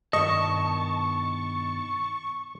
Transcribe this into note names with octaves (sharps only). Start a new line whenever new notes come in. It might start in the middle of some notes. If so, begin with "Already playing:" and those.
G2 B2 D#3 D#5 A5 C#6